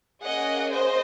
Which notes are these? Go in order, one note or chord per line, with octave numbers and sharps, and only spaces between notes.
A#3 C#4 G#4 D#5 F#5
C5 D#5